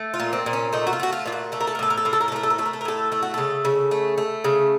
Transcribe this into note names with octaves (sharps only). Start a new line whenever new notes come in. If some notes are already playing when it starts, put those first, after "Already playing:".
Already playing: A3
F4
A#2
C4
A#2
C#4
A3 D#4
F#4
F4
A3 F#4
F4
A#2 F4
F#4
A3 A4
A#4
A4
A#4
A2 A4
A#4
A4
A2 A#4
A4
A#4
A4
A3 A#4
A4
A#4
A3 A4
A#4
A4
A#4
A2 A4
A3 A4
F#4
C#3 A4
C#3
A3
A3
C#3